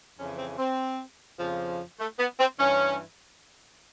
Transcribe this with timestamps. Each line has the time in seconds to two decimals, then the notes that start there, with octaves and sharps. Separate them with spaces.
0.18 F2 C#3 E3 C#4
0.38 C4
0.57 C4
1.38 F2 C#3 F3
1.99 A3
2.18 B3
2.38 C4
2.58 G2 E3 C#4